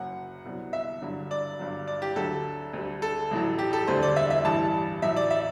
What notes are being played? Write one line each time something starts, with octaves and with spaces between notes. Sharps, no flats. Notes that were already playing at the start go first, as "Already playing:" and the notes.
Already playing: F#1 F#2 F#3 F#5
C2 B2 F#3
E5
G1 G2 D3 F#3
D5
G1 G2 F#3
D5
G4
D2 D3 F#3 A4
D2 D3 G3
A4
A1 A2 F#3
G4
A4
E1 D2 D3 G3 C5
D5
E5
E5
A1 G2 E3 G3 A5
A1 A2 F#3 E5
D5
E5